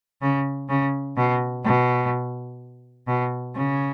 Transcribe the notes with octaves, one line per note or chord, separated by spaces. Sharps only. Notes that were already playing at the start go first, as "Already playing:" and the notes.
C#3
C#3
B2
B2
B2
C#3